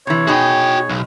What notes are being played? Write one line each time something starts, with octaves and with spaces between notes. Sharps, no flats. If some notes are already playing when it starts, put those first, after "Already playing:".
C3 E3 C#5
B2 D#4 F#4 G#4 G5
B1